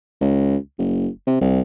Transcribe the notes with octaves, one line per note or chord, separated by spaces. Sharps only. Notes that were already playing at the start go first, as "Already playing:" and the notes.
C#2
F#1
C3
C2